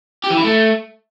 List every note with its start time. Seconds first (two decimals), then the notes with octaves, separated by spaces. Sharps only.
0.24 G4
0.30 E3
0.37 E4
0.44 A3